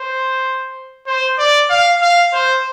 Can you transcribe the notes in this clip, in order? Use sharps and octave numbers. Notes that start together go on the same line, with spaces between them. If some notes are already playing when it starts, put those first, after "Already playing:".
Already playing: C5
C5
D5
F5
F5
C5